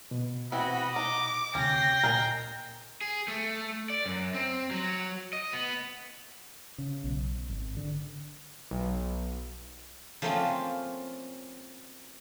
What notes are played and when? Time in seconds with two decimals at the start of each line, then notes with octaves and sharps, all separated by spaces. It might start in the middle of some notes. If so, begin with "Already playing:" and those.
0.11 B2
0.52 E3 C4 F#4 D#5 B5
0.96 D#4 D6
1.55 D2 C3 C#4 G5 A#6 C7
2.03 A#2 A#4 D#5 G#5
3.01 G#4
3.28 A3
3.90 D5
4.06 F#2
4.34 C4
4.71 F#3
5.33 D#5
5.53 B3
6.78 C#3
7.04 B1
7.50 G#1
7.77 D3
8.71 B1
10.22 F3 A3 A#3 C4 C#4 F4